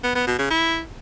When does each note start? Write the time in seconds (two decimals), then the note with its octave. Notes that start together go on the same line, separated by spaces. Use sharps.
0.03 B3
0.15 B3
0.27 B2
0.39 C#3
0.50 E4